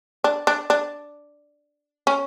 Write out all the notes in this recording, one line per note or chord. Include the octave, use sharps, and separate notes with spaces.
D4
D4
D4
C#4